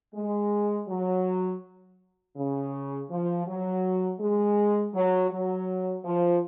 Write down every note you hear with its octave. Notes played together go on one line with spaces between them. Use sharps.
G#3
F#3
C#3
F3
F#3
G#3
F#3
F#3
F3